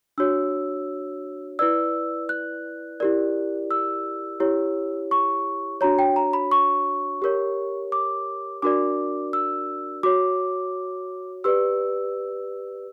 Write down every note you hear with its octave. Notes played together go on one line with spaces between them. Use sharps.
D4 F#4 C#5 E6
E4 B4 D5 E6
F#6
E4 G4 A#4 D5
E6
E4 G4 C#5
C#6
D4 F#4 C#5 A#5
G5
A#5
B5
C#6
G4 A#4 C#5
D6
D4 F#4 A#4 D5 D6
E6
F#4 C#5 D6
G4 B4 D5 E6